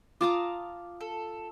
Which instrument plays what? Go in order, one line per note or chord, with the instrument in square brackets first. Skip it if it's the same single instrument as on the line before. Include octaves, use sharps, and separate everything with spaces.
[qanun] F4 A5 A#5 [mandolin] D6 D#6
[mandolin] A4